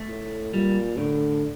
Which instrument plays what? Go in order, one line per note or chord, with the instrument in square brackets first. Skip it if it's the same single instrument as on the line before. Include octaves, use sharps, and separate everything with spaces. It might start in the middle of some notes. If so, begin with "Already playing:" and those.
Already playing: [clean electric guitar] A3
[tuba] A2
[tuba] A#2 [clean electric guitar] G3
[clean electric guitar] A2 [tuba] D3